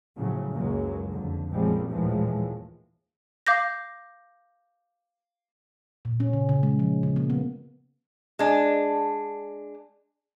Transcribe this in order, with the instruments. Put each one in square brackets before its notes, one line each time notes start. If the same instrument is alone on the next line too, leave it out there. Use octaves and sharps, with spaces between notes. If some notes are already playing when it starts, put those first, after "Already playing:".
[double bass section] A2 C#3 F3 F#3
F#1 C#2 C#3 F#3 G#3 A#3
F2 D3
A#1 F#2 F3 G3 G#3 C4
A#1 D#2 A2 E3 F3 G#3
[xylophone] F5 D6 G6 A#6
[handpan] A#2
C#4
C#3
C#3
G#3
F3
C#3
A#3
B3
[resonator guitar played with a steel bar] G#3 D4